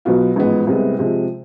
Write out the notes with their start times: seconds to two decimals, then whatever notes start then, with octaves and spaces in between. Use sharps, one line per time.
0.05 B1 B2 B3 F4
0.36 A1 G#2 F3 G#3 B3
0.67 C2 C3 G#3 B3
0.99 C3 F3 G#3